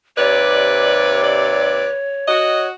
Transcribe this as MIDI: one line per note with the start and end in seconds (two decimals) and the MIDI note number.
0.18 1.88 39
0.18 1.88 48
0.18 1.20 71
0.18 2.67 73
0.18 1.88 74
1.23 1.97 71
2.28 2.72 66
2.28 2.70 75